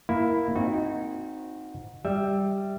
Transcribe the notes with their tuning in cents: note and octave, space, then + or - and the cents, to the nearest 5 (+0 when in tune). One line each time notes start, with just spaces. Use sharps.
A#3 +10 E4 +0
C4 +0 D#4 +0 F#4 -25
G3 +0 E5 -10